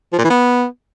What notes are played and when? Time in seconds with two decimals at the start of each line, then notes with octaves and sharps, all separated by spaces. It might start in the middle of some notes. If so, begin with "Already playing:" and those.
0.13 F3
0.19 A#2
0.24 E3
0.30 B3